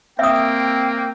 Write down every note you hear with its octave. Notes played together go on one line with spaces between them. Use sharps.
A#3 C4 E5 G5 D#6